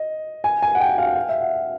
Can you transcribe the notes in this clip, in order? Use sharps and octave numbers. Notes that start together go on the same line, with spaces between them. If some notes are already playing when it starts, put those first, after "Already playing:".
Already playing: D#5
G#5
G#5
F#5
G5
F#5
F5
F#5
F5
E5
F#5